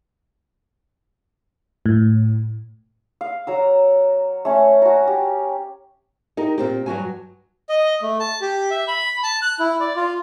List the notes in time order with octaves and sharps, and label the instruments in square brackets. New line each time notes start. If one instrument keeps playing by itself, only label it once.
[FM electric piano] A2
[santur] F5
F#3 A#5 E6
A3 C#4
F#4 A#4
G4
[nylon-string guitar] D#4 G4 A#4
A#2 C4 G4
G2 F#3 F#4 G#5
[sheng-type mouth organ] D#5
A3
A5
G4
E5
B5
A5
F#6
E4
D5
F4